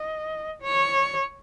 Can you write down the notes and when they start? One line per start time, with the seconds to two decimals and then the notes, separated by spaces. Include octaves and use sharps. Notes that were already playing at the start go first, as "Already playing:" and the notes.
Already playing: D#5
0.62 C#5